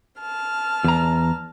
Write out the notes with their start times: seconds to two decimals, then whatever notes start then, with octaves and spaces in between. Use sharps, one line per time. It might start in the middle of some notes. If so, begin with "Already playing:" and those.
0.19 A5 F6
0.84 E2 A#5